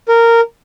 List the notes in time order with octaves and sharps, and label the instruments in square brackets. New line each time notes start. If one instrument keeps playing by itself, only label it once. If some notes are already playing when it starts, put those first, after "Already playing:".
[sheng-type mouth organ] A#4